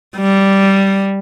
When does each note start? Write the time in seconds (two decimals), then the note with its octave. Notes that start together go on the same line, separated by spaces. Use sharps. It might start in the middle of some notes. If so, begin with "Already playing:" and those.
0.17 G3